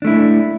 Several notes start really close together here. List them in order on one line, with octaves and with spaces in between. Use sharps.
D4 A3 E4